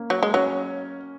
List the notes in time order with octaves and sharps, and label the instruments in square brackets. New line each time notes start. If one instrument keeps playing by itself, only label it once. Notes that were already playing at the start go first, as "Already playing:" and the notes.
Already playing: [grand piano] A#3 C#4
[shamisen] F#3
G#3
[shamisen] F#3 [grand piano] C#4